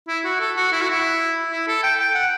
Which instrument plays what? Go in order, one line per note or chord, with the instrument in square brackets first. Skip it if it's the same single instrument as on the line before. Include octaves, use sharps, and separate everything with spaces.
[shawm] E4
F#4
A4
F#4
E4
F#4
E4
E4
A4
G5
G5
F#5